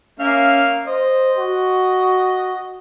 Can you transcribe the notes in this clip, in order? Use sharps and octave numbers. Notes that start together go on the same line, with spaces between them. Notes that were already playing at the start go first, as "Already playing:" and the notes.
A#3 C#4 E5 F5
C5 D#5
F#4